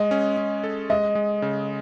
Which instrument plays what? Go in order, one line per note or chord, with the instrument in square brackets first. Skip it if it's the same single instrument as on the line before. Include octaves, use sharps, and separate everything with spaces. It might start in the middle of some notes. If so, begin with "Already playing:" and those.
Already playing: [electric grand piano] G#3 [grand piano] D#5
[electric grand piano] C#4
C#4
A4
[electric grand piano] G#3 [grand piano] D#5
[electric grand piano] G#3
C#3